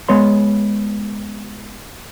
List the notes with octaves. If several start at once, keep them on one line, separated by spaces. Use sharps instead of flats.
G#3 B3 C#5 C6